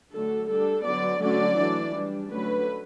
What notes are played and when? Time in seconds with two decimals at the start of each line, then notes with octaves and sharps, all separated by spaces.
0.13 D3 F#3 A3 A4
0.50 G3 D4 A4
0.85 D3 F#3 B3 D5
1.21 D3 F#3 A3 C#4 D5
1.58 E3 A3 D4
1.95 G3 D4
2.31 D3 F#3 A3 C#4 B4